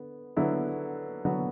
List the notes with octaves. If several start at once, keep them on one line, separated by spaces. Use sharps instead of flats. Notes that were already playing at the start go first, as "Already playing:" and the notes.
Already playing: D3 B3
D3 F#3 B3 E4
D3 F#3 B3 F#4